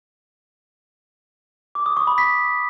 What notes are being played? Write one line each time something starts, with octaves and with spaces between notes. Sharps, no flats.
D6
D#6
C#6
B5
B6